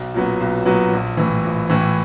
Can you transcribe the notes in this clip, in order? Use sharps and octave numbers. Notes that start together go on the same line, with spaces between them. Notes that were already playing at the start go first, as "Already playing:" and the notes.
Already playing: B1
A#2 F#3 B3
B1
A#2 F#3 B3
A#1
A2 E3
A#1
A2 E3